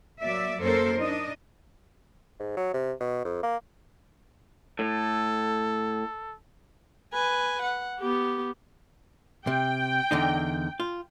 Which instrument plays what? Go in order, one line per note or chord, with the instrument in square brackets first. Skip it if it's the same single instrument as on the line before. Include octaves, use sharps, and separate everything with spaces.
[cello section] F#3 A#3 D5 E5
F#2 A#3 A4 A#4 C5 C#5
D4 D#4 D#5
[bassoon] G#2
F#3
C3
B2
F2
A#3
[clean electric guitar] A2 [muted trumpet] A4
[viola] B4 G#5
F#5
B3 G4
[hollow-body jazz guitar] C3 [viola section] G5
[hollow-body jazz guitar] E2 D3 D#4
F4